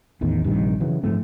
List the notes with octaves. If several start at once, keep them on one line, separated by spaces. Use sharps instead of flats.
A1 E2 D#3
A#1 G2 C3 D#3
C#3 E3 F#3
G#2 F3 A3 C4